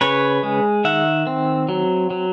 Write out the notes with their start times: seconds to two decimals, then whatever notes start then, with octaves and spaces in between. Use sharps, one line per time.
0.01 C#3 B4 C#5
0.43 G#3
0.84 D#3 E5 F#5
1.27 C4
1.69 F#3
2.10 F#3